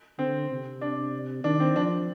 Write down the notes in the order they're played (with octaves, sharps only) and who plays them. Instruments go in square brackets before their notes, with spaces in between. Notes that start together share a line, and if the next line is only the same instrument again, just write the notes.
[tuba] D3 [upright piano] C4
[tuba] C3
[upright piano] D4
[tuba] D#3 [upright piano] D4
[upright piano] C4
[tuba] F3 [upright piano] D4